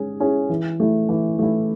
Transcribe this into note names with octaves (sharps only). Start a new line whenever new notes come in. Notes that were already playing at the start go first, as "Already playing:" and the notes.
Already playing: G#3 C#4 G#4
C#4 E4 G#4
E3
A3 E4
E3
A3 E4